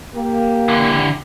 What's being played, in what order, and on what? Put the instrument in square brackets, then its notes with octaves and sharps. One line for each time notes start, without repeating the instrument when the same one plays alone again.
[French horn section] A#3 [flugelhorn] G4
[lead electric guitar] D3 E3